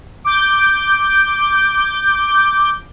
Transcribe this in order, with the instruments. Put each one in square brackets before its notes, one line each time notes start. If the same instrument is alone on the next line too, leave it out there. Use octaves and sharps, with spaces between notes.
[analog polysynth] D6 G6